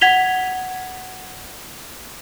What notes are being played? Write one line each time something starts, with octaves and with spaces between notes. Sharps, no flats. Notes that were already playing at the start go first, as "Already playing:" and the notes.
F#5 G#6 B6 F7 G7